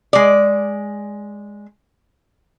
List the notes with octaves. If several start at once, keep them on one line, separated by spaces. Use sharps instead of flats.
G#3 D5